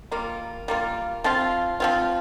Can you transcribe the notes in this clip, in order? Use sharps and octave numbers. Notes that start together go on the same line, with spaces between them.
G3 A#3 F4
G3 A#3 F4
F3 C4 F4
F3 C4 F4